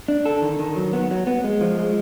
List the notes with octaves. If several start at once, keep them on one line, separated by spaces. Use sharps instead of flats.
D4
A4
D#3
D#3
F#3
B3
F#3
B3
G#3
F3
G#3